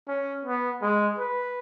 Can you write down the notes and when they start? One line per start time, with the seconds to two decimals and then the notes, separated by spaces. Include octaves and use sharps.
0.08 C#4
0.45 B3
0.82 G#3
1.19 B4